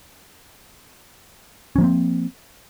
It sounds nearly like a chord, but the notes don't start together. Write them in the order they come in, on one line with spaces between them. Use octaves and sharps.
C#4 F3 A#3 C4